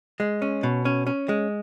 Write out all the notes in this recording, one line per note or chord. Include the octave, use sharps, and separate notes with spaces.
G#3
C#4
B2
C#4
C#4
G#3